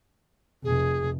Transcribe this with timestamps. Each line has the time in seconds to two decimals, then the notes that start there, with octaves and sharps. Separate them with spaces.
0.64 F1 G#4